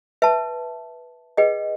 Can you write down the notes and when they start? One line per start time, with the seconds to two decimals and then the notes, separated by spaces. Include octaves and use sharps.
0.22 B4 E5 A5
1.37 G#4 B4 D#5 G5